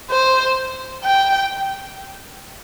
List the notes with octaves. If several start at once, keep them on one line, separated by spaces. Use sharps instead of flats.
C5
G5